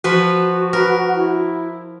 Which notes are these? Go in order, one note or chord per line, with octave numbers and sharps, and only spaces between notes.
F3 F#4 B4
A#4 B4
E4